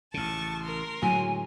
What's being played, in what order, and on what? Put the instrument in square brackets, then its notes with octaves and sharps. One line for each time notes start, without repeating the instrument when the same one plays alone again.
[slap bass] A1 C#3 [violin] A5 C#6
[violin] A#4 C6
[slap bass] A2 D3 G#3 [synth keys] F#3 [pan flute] G#5